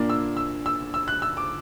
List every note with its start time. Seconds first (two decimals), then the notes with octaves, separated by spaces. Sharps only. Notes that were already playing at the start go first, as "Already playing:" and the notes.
Already playing: A#2 A#3 D4
0.10 E6
0.37 E6
0.66 E6
0.94 E6
1.08 F#6
1.22 E6
1.37 D6